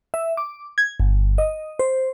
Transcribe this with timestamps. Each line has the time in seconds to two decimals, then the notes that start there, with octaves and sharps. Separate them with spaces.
0.14 E5
0.37 D6
0.78 G#6
1.00 G1
1.38 D#5
1.79 C5